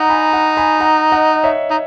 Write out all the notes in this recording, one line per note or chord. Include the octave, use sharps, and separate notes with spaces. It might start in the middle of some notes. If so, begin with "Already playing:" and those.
Already playing: D#4 F#5 A#5
G#5 B5
F#5 A#5
G#5 B5
F#5 A#5
D#5 F#5
C#5 E5
D#4